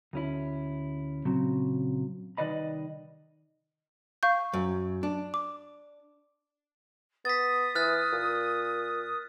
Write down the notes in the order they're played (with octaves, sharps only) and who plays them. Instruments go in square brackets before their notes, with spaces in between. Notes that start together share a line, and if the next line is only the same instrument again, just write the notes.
[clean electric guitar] D2 C#4 E4
A#2 C#3 F#3 C4
C2 D#3 B4 D5 D#5 B5
[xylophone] F5 C#6 G6
[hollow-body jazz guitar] F#2
D4
[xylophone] D6
[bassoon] B3 [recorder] D#6 [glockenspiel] A6 B6
[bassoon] E3 [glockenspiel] F6 F#6 A6
[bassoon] A#2